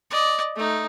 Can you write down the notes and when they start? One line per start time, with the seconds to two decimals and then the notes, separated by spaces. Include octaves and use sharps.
0.11 D5 D#5
0.56 A3 D#4